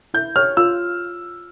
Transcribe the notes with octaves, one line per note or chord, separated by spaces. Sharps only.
E4 G6
G4 C#5 F6
F4 E6